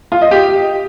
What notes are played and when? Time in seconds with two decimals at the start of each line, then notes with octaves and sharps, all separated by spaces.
0.12 F4
0.21 D#5
0.31 G4